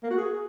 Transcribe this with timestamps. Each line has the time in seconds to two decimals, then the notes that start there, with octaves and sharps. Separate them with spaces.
0.03 A#3
0.11 F#4
0.18 G#4